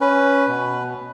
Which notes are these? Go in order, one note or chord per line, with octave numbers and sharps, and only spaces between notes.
C#4 B4
B2